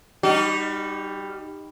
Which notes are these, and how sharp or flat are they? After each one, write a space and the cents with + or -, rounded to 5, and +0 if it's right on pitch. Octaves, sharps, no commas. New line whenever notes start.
G3 +15 D#4 -15 F#4 +45